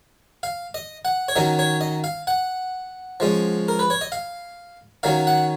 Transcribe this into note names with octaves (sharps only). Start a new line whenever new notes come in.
F5
D#5
F#5
C#5
D#3 F#3 C#4 D#5
C#5
D#5
F5
F#5
F3 G#3 C#4
A#4
B4
C#5
D#5
F5
D#3 F#3 C#4 F5
F#5